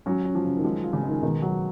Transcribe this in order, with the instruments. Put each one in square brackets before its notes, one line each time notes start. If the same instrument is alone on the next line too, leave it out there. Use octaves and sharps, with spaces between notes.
[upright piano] F#3 [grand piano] C#4
[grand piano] C#4
[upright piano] F3
[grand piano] C#3
[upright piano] D#3
[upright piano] F3 [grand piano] G#3
[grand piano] F4
[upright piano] C#3
[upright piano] D#3 [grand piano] G#3
[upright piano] B2 [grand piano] D#3
[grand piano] F#3